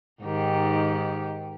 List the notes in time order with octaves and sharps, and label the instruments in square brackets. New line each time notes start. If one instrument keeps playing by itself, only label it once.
[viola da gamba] G#2 D#3 G4